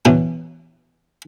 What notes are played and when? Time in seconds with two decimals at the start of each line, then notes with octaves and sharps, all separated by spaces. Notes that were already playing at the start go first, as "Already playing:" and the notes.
0.05 B2 E3 F#3 D4